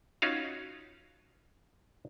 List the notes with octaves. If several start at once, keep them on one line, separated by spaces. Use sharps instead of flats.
C#4 D#4 F4 F#4 F5